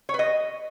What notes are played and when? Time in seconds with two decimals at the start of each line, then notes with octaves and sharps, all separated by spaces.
0.09 C#5
0.14 B4
0.19 D#5